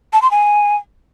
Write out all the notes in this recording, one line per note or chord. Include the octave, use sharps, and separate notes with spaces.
A5
C6
G#5